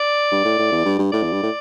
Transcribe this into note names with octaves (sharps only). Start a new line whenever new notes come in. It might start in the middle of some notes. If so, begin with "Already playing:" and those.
Already playing: D5
G2
A2
A2
E2
G2
G2
A2 D5
E2
G2
A2